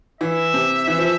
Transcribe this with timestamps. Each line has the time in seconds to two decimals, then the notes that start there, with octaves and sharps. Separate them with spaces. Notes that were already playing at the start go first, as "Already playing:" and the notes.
0.21 E3 E5
0.54 C3
0.88 E3
0.98 F3